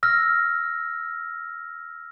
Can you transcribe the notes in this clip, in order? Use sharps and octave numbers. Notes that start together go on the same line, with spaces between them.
E6 F6 A#6